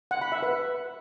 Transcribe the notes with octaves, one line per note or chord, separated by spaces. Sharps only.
F#5
B5
E5
B4